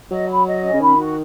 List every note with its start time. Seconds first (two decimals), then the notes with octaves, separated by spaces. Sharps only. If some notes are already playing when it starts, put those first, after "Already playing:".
0.11 F#3 D#5
0.29 B5
0.47 D#5
0.63 C#4
0.74 C#3
0.80 D#3 B5
0.98 F#4